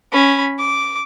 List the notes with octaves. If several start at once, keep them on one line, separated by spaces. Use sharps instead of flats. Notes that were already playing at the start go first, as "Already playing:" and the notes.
C#4 B5
D6